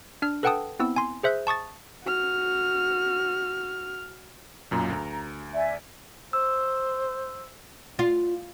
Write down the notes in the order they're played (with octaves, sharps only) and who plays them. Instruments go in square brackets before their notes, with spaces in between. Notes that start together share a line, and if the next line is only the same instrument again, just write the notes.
[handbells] D4 F6
A4 B4 F#5 G5 A5 D#6
B3 C4 E4 E6
G#5 C6
G#4 C5 E5 F#6 G6
A5 C#6 D#6 A6
[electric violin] F#4 F6
[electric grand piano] B1 F#2 A#2 [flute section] A#5
[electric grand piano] D2
[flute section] D5 E5 G#5
[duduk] C5 [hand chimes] E6
[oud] F4